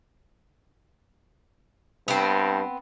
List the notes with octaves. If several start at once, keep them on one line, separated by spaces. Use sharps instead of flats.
G2 B3 C4